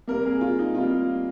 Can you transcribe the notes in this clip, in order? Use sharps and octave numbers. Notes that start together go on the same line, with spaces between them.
C3 G3 A#3 A#4
G#4
F4
D#4
C3 G3 A#3 F4